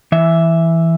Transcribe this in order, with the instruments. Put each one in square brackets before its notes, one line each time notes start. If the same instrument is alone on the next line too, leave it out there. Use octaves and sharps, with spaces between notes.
[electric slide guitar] E3 E5